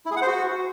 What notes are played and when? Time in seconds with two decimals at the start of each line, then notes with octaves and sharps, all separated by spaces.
0.06 E4
0.11 G#4
0.16 F#5
0.22 C5
0.27 F#4